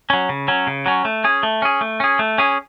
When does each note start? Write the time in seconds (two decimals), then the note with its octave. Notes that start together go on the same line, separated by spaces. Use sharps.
0.10 F#3 C#4
0.29 C#3
0.48 F#3 C#4
0.67 C#3
0.86 F#3 C#4
1.05 A3
1.24 C#4 G#4
1.43 A3
1.62 C#4 G#4
1.81 A3
2.00 C#4 G#4
2.19 A3
2.38 C#4 G#4